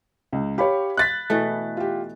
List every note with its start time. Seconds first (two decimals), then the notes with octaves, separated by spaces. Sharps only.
0.32 C#2
0.58 G4 C#5 F5 B5
0.97 F#6 A6 B6
1.30 B2 E3 A3
1.77 F4 G4